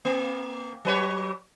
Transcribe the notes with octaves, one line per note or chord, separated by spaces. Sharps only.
A#3
F#3 B4 C#5